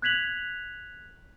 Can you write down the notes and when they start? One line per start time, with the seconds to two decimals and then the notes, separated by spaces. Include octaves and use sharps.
0.02 F#6 G#6 B6 F7 F#7